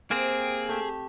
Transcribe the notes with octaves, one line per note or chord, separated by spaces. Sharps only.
C3 A#3 C4 G#4
A3 G4 E5